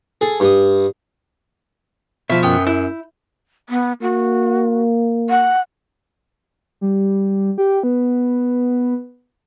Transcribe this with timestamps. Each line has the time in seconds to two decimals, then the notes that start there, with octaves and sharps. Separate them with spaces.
0.21 G#4 A4
0.40 G2 D#6
2.30 B2 F3 E5
2.43 F#2 B3 G5
2.67 E4 G6
3.69 B3
4.02 A#3 F#4
5.30 F#5
6.81 G3
7.58 G4
7.83 B3